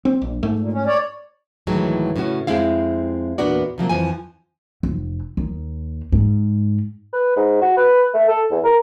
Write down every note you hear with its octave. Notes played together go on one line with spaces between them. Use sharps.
C4
A#1
G#2 A3
A#2
C#4
C#5 D5
D2 A2 D#3 E3 F#3 G#3
A2 C#3 C#4 F#4
F2 A#2 G#3 C4 E4 F5
E2 A#2 B3 D4 F#4 D5
C3 F3 F#3 A#3
F2 E3 F3 G#5
F1
D#2
G#2
B4
G#2
F#4
B4
A3
A4
E2
A#4